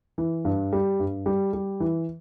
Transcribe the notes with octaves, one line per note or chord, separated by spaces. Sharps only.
E3
G2
G3
G2
G3
G3
E3